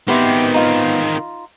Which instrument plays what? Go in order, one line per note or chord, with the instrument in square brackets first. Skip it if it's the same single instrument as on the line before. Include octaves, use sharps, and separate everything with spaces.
[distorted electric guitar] D#3 C4 [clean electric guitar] B3 B4 [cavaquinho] E4 G4 C6
[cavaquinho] D#4 F4 F5